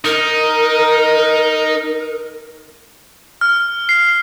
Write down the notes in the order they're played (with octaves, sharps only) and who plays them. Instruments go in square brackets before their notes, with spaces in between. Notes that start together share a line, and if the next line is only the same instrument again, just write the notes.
[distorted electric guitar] D#4 [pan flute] A#4
[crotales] F6
C7